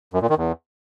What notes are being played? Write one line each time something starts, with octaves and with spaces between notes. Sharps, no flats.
F#2
A#2
D#3
E2